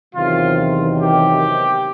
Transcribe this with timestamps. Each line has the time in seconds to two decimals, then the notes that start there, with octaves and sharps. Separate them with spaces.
0.15 E2 C3 D#3 F#3 F4
0.98 G4